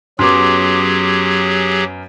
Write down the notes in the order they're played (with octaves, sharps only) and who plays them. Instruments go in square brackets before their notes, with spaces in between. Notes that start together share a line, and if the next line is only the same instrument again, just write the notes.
[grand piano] F#2 B3 [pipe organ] F#3 G4 G#4 [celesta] C6 D6